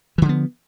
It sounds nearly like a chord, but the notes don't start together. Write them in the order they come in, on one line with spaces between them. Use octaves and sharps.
E3 D3 F3 B3